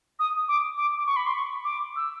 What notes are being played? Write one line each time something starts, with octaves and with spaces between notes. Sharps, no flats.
D#6
D6
D6
D6
C#6
B5
C6
C#6
D6
E6